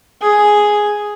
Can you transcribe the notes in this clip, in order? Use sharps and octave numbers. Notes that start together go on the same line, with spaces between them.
G#4 G#5